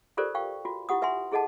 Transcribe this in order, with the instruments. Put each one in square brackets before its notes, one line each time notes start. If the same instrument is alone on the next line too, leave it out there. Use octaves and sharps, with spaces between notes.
[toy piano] F4 G4 A4 A#4 C5 D5
F5 G5 C#6
F4 F#4
E4 F4 G4 F#5 D#6
B4 E5 F#5 G#5 C6
E4 G#4 A4 D#5 F#5 A5